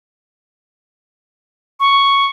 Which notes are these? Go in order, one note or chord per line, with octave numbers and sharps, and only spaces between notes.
C#6